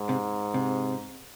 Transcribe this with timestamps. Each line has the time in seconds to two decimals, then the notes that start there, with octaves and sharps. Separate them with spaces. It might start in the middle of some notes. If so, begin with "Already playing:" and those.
Already playing: G#2
0.09 C3
0.54 C3